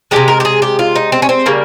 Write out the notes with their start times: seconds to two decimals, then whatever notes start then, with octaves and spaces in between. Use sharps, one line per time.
0.11 F3 G#3 G4
0.16 C3
0.28 A#4
0.40 G4
0.45 G#4
0.62 G4
0.79 F4
0.96 D#4
1.12 C4
1.22 C#4
1.29 C4
1.46 C#3 G3 A#3